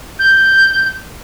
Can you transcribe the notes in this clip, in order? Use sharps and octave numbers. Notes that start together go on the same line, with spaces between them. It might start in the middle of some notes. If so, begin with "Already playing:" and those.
G6